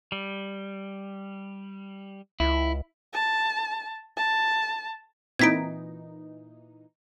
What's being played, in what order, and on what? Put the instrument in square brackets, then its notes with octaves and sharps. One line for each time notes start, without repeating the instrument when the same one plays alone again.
[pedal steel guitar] G3
[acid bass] C#2 [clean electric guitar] E4
[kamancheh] A5
A5
[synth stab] A#2 E3 D#4 [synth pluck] C4 E4 [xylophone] G#6 B6 D7